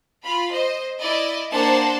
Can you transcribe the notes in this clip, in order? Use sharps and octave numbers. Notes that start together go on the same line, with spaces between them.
F4 B5
C5 D#5
E4 D5 D#5
A#3 D4 C5 F#5 A5